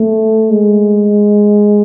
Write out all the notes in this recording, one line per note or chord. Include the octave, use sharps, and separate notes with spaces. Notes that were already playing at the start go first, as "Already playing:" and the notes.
Already playing: A3
G#3